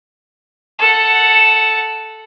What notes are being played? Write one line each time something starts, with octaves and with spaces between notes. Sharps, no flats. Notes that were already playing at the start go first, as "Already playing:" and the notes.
A4 F#5